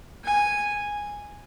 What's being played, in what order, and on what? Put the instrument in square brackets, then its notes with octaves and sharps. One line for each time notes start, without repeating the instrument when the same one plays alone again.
[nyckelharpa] G#5